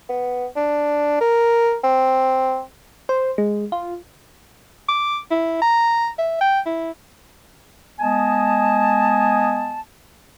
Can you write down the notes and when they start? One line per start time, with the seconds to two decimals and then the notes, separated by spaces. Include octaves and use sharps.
0.10 B3
0.56 D4
1.21 A#4
1.84 C4
3.09 C5
3.38 G#3
3.72 F4
4.89 D6
5.31 E4
5.62 A#5
6.19 E5
6.41 G5
6.66 E4
7.99 G#3 B3 D#5 G#5 A5